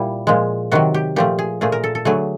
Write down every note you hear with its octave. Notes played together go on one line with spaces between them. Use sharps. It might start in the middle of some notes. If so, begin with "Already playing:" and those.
Already playing: A#2 G3 E4
A#2 F3 G#3
C3 D#3 F#3 F#4
G4
A#2 F3 A3 G4
G#4
A#2 F3 A3 G#4
A#4
A4
A4
D3 F#3 A3 G#4